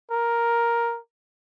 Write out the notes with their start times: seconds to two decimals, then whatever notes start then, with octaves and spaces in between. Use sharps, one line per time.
0.11 A#4